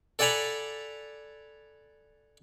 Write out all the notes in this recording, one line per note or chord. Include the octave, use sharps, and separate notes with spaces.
A4 D5 F#5 G#5 A#5 B5